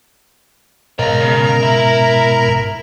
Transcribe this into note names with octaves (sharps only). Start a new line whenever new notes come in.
G#2 B2 A#4 C#5 D#5 A#5
C#3
E4